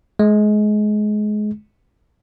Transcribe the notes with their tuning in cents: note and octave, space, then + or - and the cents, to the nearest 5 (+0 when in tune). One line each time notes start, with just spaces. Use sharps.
G#3 +25